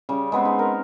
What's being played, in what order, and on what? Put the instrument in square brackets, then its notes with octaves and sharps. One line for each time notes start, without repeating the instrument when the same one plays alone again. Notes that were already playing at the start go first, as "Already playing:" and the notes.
[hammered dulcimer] C#3 G3
G#3 B3 C4
D#4
A#4